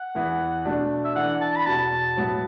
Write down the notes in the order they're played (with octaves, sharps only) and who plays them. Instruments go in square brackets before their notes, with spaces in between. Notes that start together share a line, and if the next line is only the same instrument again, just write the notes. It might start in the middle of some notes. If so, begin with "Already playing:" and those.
Already playing: [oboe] F#5
[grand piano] E2 E3 B3
B2 A3 D4
[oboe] E5
[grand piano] E3 D4 A4 [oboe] F#5
[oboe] A5
B5
[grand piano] E2 B2 B3 [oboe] A5
[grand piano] A2 F#3 B3 F#4